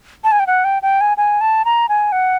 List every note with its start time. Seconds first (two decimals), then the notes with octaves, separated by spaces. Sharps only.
0.24 A5
0.32 G#5
0.40 G5
0.47 F#5
0.64 G5
0.83 G5
1.01 G#5
1.17 G#5
1.41 A5
1.65 A#5
1.89 G#5
2.12 F#5